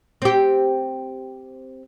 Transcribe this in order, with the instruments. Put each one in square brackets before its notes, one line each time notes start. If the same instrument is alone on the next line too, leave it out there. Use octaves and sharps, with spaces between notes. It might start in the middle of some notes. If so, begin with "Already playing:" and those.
[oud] C4 G4